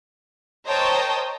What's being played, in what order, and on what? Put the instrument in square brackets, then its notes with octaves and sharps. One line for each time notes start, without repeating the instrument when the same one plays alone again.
[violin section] A#4 C5 C#5 D#5 G5 A5